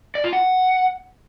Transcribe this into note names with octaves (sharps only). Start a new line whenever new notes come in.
D5
F4
F#5